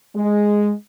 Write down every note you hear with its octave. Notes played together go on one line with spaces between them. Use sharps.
G#3